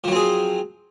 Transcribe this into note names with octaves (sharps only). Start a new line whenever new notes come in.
F3 F#3 C4 G#4